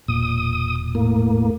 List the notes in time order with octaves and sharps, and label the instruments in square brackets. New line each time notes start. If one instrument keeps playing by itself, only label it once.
[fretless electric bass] E1 A#2 [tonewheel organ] D#6
[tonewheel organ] A2 A#3